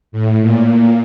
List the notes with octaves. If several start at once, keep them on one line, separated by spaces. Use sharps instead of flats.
A2
A#2